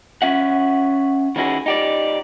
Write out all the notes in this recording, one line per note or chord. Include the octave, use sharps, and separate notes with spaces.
C#4 E5 F#5
D#3 C#4 E4 F#4 G#4
D#4 G4 D5